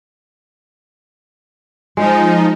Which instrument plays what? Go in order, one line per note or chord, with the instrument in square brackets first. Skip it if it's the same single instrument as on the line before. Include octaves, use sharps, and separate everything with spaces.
[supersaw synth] F3 D#4 [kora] G#3